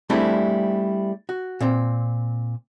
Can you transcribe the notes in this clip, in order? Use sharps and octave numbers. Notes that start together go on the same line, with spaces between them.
G3 A3 C4 D4 E4 G#4
F#4
A#2 C4